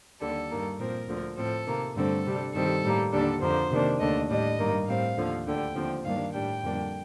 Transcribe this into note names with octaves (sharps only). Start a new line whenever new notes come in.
D#2 D3 G3 A4
G2 D#3 A#3
A#2 F3 C4 A#4
D2 D3 F3
A2 F3 C4 A4
C3 D#3 A#3
G2 D3 A3 C4 A4
C3 G3 D4
G2 D#3 G3 C4 A4
A2 G3 A#3
D#2 D3 G3 D4 A4
F2 D3 F3 A#3 C5
C3 D#3 A#3 D4
D#2 D3 A3 D4 D#5
A2 G3 D4 D#5
G2 D#3 A#3
A2 G3 C4 F5
D#2 D3 F3
D2 D3 G3 G5
D#2 D3 F3 C4
G2 D#3 G3 A#3 D4 F5
A2 G3 D4 G5
F2 D3 G3 A#3 D4